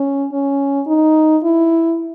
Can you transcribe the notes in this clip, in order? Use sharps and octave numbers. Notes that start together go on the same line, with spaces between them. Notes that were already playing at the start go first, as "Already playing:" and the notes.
Already playing: C#4
C#4
D#4
E4